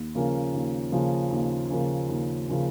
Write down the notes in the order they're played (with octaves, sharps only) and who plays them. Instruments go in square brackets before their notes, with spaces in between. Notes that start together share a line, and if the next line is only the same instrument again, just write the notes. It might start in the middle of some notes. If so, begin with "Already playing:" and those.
Already playing: [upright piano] D#2
C#3 F3 A#3 C#4
D#2
C#3 F3 A#3 C#4
D#2
C#3 F3 A#3 C#4
D#2
C#3 F3 A#3 C#4